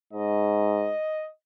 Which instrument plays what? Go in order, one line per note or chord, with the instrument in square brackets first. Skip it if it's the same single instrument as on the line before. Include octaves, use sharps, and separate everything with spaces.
[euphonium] G#2 [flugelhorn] D#5